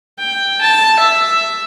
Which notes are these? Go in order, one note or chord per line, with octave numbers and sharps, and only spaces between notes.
G5
A5
E5